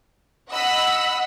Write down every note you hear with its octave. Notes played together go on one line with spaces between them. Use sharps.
D#5 F#5 B5 E6